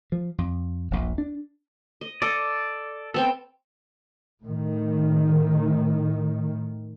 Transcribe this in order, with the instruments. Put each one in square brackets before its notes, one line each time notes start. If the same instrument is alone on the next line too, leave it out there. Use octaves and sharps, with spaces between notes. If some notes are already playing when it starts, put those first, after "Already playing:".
[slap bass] F3
F2
D#1 A#1
D4
[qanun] D#5
[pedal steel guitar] A4 D5 [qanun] D#5
[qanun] B3 C4 G5 [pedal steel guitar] A4
[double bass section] A2 D#3